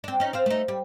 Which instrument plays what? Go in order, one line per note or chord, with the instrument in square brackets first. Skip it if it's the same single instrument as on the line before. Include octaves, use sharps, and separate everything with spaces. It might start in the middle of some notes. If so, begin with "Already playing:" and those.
[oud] C4 D4
C#4 D#4
C4 C5 F5
A3 D#4
G3